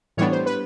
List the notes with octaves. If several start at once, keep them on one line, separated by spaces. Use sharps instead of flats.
A2 E3 G3 B3 D4 C#5
C5
B4